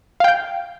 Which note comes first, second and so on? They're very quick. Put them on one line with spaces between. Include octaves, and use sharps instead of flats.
F5 G5 G6